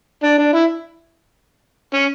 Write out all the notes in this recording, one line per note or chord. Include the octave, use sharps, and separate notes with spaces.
D4
D4
E4
C#4